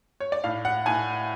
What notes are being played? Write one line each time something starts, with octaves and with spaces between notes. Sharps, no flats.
C#5
D5
A2 F5
F#5
A2 G#5